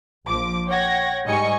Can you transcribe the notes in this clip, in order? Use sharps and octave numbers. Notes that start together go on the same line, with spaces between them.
A#1 F3 D6
C#5 F#5 G5 G#6 A#6
G#2 G3 D#5 G#5 C#6 C#7